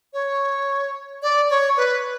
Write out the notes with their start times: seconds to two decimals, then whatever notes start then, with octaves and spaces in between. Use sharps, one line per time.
0.13 C#5
1.23 D5
1.50 C#5
1.77 B4